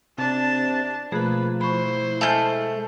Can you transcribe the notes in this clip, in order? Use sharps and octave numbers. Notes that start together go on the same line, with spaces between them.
C3 D4 A5
B2 F3 A3 A#3 G#4 B4
E4 C5 B5 C#6
G#3 A3 G#5 F6 G6